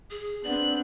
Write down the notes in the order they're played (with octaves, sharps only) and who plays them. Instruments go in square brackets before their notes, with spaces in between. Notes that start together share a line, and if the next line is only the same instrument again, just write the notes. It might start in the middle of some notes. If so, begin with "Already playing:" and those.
[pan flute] G#4
[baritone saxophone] B3 [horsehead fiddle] C4 D4 [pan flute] D5 [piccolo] F#7